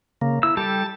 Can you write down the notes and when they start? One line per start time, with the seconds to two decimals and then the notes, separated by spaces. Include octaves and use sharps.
0.21 C#3 A#3
0.43 E4 E6
0.57 G3 G4 A4 A5